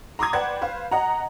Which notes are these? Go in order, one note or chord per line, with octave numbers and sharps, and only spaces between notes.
A#5 C6 D6 D#6 G#6
B4 C5 D5 F#5 G5 G#6
B4 C5 F5
D#5 F#5 A#5